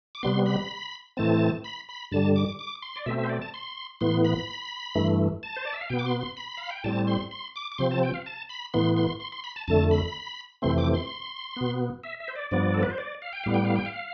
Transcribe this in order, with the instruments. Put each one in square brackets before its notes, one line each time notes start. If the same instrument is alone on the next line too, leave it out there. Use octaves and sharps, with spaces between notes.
[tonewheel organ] D6
C3 G3 B3 C6
B5
A2 E3 A3 C4 A5
B5
B5
G2 D3 G3 A5
D6
D6
C6
D5
B2 A3 C4 E5
E5
C5
D5
A5
C6
A2 E3 B3 C6
B5
G2 E3 A3
A5
C5
D5
E5
F5
B2 B3 G5
D6
C6
C6
B5
F5
G5
A2 G3 C4 A5
C6
C6
D6
D6
C3 F3 C4 C6
A5
G5
F5
A5
B5
A2 E3 B3 C6
C6
C6
C6
B5
A5
F2 D3 A3 A5
B5
F2 C3 E3 A3 C4 C6
D6
C6
B2 B3
E5
E5
C5
D5
G2 F3 B3 D5
A4
B4
C5
D5
F5
G5
A2 G3 B3 F5
G5
F5
G5
F5